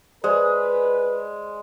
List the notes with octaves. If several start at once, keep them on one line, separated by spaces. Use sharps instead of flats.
G#3 B4 C5 D5 G#5